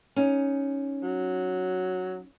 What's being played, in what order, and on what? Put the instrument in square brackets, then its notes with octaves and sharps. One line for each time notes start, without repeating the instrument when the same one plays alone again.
[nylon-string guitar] C#4 D#4
[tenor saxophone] F#3